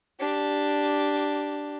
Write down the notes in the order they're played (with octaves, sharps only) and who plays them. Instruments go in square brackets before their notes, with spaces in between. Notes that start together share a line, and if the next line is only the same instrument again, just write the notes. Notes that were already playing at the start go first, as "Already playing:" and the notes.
[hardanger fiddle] D4 G4